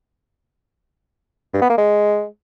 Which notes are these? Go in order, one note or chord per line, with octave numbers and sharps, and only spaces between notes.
G2
B3
A#3
G#3